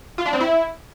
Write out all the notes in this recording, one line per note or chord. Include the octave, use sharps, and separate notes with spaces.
F4
D4
C4
E4